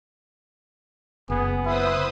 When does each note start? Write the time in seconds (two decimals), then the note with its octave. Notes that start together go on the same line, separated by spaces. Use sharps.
1.30 F#1 B3 G#4
1.65 E4 B4 C5 D#6